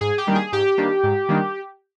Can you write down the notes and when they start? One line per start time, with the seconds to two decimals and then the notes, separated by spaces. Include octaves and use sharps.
0.01 G#2 G#4
0.18 G4
0.27 D#3 G3 A#3 D4
0.35 G#4
0.52 G#2 G4
0.78 D#3 G3 A#3 D4
1.03 G#2
1.29 D#3 G3 A#3 D4